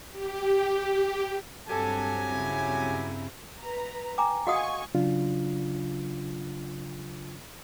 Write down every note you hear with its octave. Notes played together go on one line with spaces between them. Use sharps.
G4
G2 F#3 C4 G4 A4 G#5 A#5
C#3 E4
B4 A#5
G5 G#5 A#5 D6
F#4 D#5 F5 F#5 G#5 C#6 D#6
C#3 F#3 D4 F4